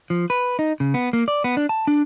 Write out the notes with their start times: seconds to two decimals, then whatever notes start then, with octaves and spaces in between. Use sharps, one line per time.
0.10 F3
0.30 B4
0.59 D#4
0.80 C#3
0.94 B3
1.13 A#3
1.28 D5
1.44 B3
1.57 D4
1.69 A5
1.87 D4